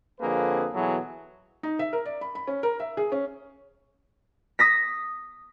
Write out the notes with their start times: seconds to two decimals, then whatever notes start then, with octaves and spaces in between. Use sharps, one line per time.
0.20 F2 D3 A#3 C4 G#4 B4
0.73 B2 E3 F#3 B3 G#4 A4
1.63 D#4
1.79 E5
1.93 A#4
2.06 D5
2.21 B5
2.35 B5
2.47 C#4
2.63 A#4
2.80 E5
2.97 G#4
3.12 C#4
4.59 D#6 A#6 B6